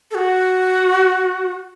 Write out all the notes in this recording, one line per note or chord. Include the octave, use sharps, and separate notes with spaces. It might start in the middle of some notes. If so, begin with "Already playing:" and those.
A4
F#4